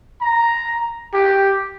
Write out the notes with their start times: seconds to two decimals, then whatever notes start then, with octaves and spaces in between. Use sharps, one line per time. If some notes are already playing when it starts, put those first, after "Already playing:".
0.21 A#5
1.14 G4